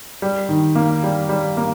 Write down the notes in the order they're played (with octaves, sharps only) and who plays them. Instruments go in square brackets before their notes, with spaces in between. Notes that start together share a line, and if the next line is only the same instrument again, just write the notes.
[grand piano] G3
D#3
A#3
G3
G3
A#3